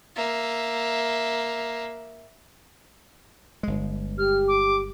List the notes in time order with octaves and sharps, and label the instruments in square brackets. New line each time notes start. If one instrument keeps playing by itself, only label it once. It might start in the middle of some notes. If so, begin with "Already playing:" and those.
[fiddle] A#3 E5
[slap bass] G1 G#3
[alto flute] G4 [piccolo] F6
[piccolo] D6